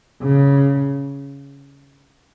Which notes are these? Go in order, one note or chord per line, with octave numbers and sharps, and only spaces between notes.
C#3